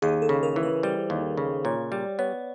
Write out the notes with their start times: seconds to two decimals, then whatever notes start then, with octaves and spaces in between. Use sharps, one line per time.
0.02 D#2 G#4
0.22 A4
0.29 C#3
0.43 A#4
0.56 E3
0.63 B4
0.83 G3 C5
1.10 D#2
1.37 C#3
1.65 A#2 C#5
1.92 G3 D5
2.19 B3 C#5